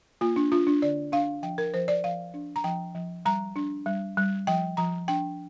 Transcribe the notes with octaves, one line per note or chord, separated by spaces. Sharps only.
A#3 F4
D4
D4 F4
D4
D3 D5
D4 F5
F3 G5
A#4
F3 C5
D5
F3 F5
D4
A#5
F3 G5
F3
G3 A#5
D4
G3
G3
F3 G5
F3 A#5
D4 G5